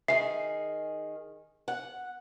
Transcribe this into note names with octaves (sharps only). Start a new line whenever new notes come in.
D#3 G#4 E5 C7
F#5